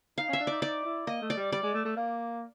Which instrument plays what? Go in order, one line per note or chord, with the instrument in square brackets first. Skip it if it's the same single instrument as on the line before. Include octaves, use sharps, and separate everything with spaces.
[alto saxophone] D#4 [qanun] F5
[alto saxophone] C#4 [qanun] E5
[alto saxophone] D4
[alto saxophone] D#4 [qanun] D5
[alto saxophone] D#4 [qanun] D5
[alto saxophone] E4
[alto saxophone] A#3 [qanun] D#5
[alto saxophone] A3
[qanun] D5
[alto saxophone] G3
[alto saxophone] G3 [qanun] D5
[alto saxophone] G#3
A3
A3
A#3